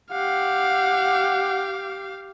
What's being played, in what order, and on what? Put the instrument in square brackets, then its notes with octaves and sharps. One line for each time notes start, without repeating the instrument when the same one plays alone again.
[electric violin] G4 F5 [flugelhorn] F#5